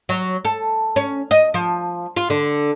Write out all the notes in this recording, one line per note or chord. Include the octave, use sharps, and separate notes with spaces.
F#3
A4
C#4
D#5
F3
F4
D3